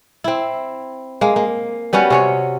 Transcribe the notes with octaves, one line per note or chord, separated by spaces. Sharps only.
C4 E4
G#3 A#3
A#3
G3 B3 C#4 F#4
C3 C#4 C#5